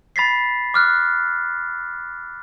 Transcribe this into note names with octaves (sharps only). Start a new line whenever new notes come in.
B5 A6 B6 C7
D6 F6 F#6